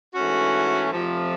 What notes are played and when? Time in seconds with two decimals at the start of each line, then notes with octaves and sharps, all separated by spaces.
0.15 G#2 E3 A3 C#4 F#4
0.90 F2 C3 F3 A3